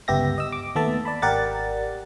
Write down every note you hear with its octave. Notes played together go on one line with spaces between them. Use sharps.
G1 C#2 B3 G4 E5 A#6
D#5 E6
D6
D#2 A3 B3 A4 E5 A5
D5 A5 B5
G#1 G4 A#4 D5 F#5 A6